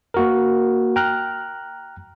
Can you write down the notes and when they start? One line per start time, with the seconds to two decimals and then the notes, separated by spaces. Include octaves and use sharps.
0.14 A#3 F#4 A#4
0.96 G5 A#5 F6 F#6